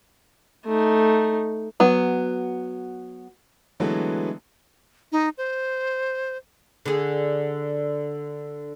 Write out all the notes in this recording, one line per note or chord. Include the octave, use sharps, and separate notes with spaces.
A3 D#4
F#3 B3
D3 E3 F#3 G#3 A3 B3
D#4
C5
D3 G#4